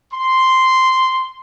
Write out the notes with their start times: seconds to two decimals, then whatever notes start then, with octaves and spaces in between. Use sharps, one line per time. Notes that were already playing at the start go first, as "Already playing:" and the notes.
0.12 C6